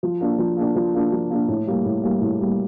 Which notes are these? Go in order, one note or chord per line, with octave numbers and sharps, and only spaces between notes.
F3
A#3 D4
F3
A#3 D4
F3
A#3 D4
F3
A#3 D4
A2
G3 A#3
A2
G3 A#3
A2
G3 A#3